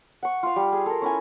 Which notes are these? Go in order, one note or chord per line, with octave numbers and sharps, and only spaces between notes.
F#5 C#6
F4 F5
G3
G#4
A4 A#4
C#4 E4 G#5